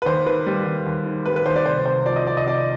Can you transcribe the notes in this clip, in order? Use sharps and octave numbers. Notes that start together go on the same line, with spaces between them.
B4
D#2 C5
D#3 B4
G3
D#2
D#2
D#3
G3 B4
B4
D#2 C5
D5
C2 C5
C3 C5
F3 D5
D#5
C2 D5
D#5
C2 D5